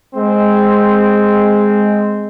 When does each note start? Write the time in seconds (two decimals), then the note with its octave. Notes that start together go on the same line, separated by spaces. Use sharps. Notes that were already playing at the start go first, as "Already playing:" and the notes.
0.16 G#3 C4